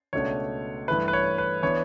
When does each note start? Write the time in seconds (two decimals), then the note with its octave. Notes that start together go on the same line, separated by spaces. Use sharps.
0.13 C#2 B2 A3 D4 C#5
0.88 G2 E3 A3 E4 B4
1.08 B4
1.13 C#5
1.38 B4
1.63 E3 B3 D4 C#5